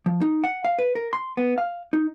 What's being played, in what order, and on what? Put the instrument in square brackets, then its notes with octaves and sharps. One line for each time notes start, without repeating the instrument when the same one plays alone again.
[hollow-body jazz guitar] F3
D#4
F#5
F5
B4
A#4
C6
B3
F5
D#4